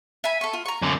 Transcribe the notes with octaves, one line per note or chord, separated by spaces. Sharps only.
E5 G#5 B5
A4 C#6
F4
A#5 C#6
F#2 D3